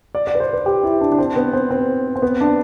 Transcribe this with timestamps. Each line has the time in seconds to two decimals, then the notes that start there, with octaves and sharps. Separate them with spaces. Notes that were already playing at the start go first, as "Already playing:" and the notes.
0.15 D5
0.27 D5
0.35 B4
0.40 C5
0.53 B4
0.66 G4
0.83 E4
1.01 D4
1.12 D4
1.18 C4
1.36 B3
1.53 C4
1.71 C4
2.16 C4
2.22 B3
2.41 D4